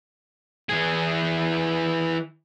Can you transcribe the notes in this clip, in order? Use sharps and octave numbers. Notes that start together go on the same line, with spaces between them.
E3 G#4